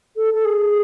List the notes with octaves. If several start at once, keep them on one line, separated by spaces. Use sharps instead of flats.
A4
A4
G#4